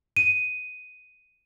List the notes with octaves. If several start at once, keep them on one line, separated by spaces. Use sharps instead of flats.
D#7